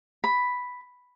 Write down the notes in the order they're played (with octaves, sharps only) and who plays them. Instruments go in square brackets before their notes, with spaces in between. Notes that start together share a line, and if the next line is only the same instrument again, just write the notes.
[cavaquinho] B5